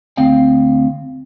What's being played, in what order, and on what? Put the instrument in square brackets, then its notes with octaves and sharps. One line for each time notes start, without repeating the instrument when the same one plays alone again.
[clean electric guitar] D2 C4 F5 G5